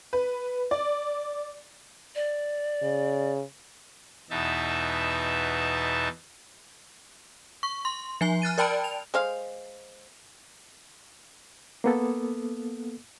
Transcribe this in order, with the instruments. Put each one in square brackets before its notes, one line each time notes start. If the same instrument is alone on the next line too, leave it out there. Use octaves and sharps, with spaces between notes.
[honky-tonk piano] B4
D5
[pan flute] D5
[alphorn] C#3
[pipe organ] E2 B2 D#4 E5 A5
[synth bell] C#6
C6
F3 G#5 C7
F6 F#6 A6 D#7
A#4 D5 G5 A5 B5 D7
F7
[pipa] G#3 C5 F5
[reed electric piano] A#3 B3 A4